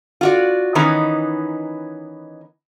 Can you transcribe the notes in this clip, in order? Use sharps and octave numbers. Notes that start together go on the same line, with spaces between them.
F4 F#4 D5
D#3 E3 B3 C#4 D#4